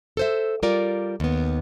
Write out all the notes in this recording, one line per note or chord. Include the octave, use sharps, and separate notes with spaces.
A4 C5 E5
G3 F4 A#4 D5
D#2 B3